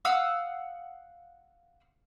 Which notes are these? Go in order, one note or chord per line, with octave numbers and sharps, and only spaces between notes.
F5 F#5 D#6 E6